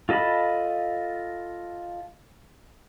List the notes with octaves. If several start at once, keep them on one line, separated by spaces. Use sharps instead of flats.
F4 A4 D#5 A5 B5